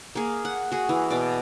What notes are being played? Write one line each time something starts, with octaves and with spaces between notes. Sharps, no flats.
A#3 G#4
F#5
F#4 G#4
E3
B2 D5